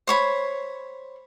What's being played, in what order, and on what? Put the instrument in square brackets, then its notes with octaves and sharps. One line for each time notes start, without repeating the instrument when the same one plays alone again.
[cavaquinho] C5 C#5 B5